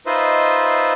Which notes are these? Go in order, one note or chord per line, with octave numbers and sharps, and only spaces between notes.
D#4 F4 B4 C5 D#5 E5